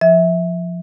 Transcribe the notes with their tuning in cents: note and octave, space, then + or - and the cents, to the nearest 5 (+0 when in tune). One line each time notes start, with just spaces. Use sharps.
F3 +0 E5 -20